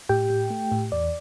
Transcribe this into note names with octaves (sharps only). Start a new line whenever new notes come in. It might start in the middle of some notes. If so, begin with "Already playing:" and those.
A2 G4 G5
A2
A3
A2
E2 D5